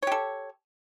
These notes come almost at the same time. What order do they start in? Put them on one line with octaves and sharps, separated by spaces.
C#5 G4 A4